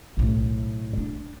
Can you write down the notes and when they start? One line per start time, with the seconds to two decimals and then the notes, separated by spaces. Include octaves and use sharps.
0.17 B1 A2
0.98 D4